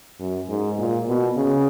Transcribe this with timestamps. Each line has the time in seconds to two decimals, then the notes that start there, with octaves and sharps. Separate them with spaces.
0.20 F#2
0.49 G#2
0.78 A#2
1.07 B2
1.37 C#3